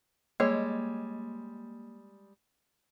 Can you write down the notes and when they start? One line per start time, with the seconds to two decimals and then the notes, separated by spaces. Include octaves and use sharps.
0.40 G3 G#3 A#3 C#5